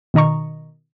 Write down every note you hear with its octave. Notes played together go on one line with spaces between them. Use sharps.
B2 D#3 D#5 A#5 C#6